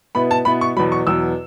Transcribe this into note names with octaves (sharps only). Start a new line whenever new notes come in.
B2 B3 E4 B5
A5
B2 B3 E4 B5
C#6
E2 B2 F#3 B5
C#6
E2 B2 F#3 E6